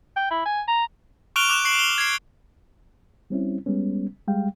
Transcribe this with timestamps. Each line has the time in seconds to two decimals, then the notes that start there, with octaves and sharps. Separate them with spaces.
0.16 G5
0.31 E4
0.45 G#5
0.68 A#5
1.36 C#6 F6 F#6 D7 F7 G7
1.49 D6 F#6 E7
1.65 C#6 C7 F#7
1.79 G7
1.98 G#6 C7
3.30 G3 C4 C#4 E4
3.66 G3 G#3 B3 C#4
4.28 G3 G#3 F5 G5